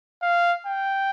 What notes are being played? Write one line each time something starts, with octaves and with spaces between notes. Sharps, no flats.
F5
G5